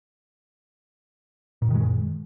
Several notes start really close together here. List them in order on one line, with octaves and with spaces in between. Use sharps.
A#2 F#2 D#3 G#3